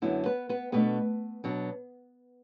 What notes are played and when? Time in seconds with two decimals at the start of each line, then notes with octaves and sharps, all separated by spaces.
0.02 F#2 D3 F#3 B3 D4 E4
0.25 B3 B4
0.49 B3 B4
0.72 B2 A3 B3 D4 B4
1.44 B2 F#3 D4